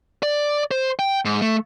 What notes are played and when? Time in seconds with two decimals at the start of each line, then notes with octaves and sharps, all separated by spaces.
0.23 D5
0.71 C5
0.99 G5
1.25 G#2
1.42 A3